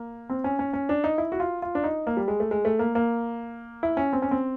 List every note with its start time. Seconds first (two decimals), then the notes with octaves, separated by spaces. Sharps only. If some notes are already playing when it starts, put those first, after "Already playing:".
Already playing: A#3
0.29 C4
0.44 C#4
0.59 C#4
0.73 C#4
0.89 D4
1.04 D#4
1.18 E4
1.32 F#4
1.40 F4
1.62 F4
1.75 D4
1.84 D#4
2.07 A#3
2.17 G3
2.28 G#3
2.40 A3
2.51 G#3
2.65 A3
2.79 A#3
2.95 A#3
3.83 E4
3.97 C#4
4.13 C4
4.22 C#4
4.31 C4